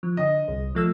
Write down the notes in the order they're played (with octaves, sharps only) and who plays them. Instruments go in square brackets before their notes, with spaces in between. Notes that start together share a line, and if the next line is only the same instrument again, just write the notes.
[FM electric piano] F3
[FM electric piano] D3 [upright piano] D#5
[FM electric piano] C2
F3 A3 E6